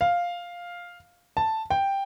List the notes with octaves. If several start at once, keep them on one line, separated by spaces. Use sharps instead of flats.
F5
A5
G5